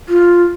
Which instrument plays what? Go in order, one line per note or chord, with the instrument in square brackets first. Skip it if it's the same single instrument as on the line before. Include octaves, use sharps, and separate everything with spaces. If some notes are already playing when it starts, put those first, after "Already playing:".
[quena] F4